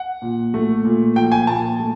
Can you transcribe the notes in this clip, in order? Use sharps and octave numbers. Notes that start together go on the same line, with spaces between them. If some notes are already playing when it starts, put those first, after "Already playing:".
Already playing: F#5
A#2
A3
A#2
F3 G5
G#5
A#2 A5
A3